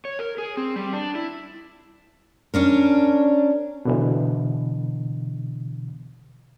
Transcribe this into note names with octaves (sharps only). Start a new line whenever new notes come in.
C#5
A#4
G#4
C4
G3
D4
E4
C#4 D4 A#4
B2 D3 E3